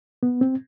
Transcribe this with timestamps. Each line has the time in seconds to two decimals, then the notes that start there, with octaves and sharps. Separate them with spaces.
0.23 B3
0.41 C4